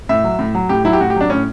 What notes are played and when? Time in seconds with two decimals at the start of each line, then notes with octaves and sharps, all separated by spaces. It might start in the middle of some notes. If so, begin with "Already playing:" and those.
0.09 A2 E5
0.24 F#3
0.39 A2
0.55 F#3
0.69 A2 G4
0.85 F#3 E4
0.93 G4
1.01 A2 F#4
1.10 G4
1.16 F#3 D4
1.30 A2 C#4